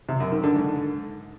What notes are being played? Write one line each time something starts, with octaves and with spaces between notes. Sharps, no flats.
C3
F#2
D#3
D3
G#2